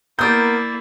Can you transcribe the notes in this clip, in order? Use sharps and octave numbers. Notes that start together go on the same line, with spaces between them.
A#3 B3 E4 A#4 D5 D#6 G6